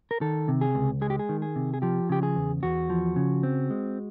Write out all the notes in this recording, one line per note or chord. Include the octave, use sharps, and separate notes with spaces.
A#4
D#3 A4
C3
G#4
C#2
G#3 G#4
G4
G#4
D#3
G#4
C3
G#4
F3 G4
C#3 G4
G#4
E2
E2 F#4
F3
C#3
C4
G#3